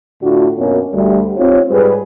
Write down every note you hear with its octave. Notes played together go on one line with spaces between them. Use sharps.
A2 D3 D4 F4 F#4
F#2 B2 A#3 C#4
D2 G3
C4 D#4 F4 G4 C#5
G#2 G3 G#4 B4